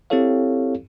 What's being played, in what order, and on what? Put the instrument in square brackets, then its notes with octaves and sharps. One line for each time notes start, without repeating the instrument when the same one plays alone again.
[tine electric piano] C4 E4 G4 A4 C#5 F5